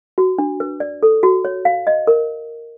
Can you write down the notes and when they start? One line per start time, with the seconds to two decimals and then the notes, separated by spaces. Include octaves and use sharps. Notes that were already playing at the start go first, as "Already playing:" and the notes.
0.18 F#4
0.38 D4
0.60 B4
0.80 D5
1.03 A4
1.23 F#4
1.45 C#5
1.65 F5
1.87 D#5
2.07 A#4